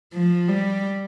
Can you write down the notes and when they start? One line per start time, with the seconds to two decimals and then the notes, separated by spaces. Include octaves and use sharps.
0.13 F3
0.48 G3